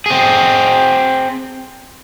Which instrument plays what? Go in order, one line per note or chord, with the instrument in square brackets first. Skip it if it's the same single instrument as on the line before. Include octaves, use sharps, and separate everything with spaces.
[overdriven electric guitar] C4 G#4